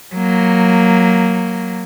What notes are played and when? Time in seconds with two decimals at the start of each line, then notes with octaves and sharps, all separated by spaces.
0.15 F#3 A#3